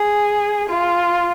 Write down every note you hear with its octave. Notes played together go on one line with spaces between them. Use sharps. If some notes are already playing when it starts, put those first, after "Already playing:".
Already playing: G#4
F4